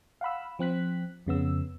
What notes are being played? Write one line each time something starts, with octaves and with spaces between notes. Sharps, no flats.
F5 F#5 B5 E6
F3 C4 F#6 B6
F2 C#3 B3 E6